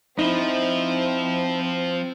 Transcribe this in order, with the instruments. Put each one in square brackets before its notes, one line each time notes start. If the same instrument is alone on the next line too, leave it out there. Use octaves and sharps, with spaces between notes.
[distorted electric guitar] F3 [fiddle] C4 [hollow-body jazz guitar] D#4 E4